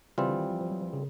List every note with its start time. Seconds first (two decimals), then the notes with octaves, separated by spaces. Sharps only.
0.18 C#3 E3 G3 C4 F4
0.29 D3
0.40 D#3
0.50 F3
0.61 F3
0.71 F#3
0.81 F3
0.93 C#3